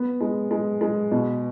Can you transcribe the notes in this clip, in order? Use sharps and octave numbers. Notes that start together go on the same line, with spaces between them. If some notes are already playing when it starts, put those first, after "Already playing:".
Already playing: B3
G#3
G#3
G#3
B2